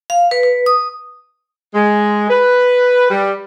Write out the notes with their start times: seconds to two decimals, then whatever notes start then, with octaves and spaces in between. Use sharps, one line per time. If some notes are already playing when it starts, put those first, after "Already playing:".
0.10 F5
0.31 B4
0.43 B4
0.66 D#6
1.74 G#3
2.30 B4
3.10 G3